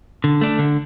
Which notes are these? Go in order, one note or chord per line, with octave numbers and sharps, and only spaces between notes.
D3
A3 D4
D3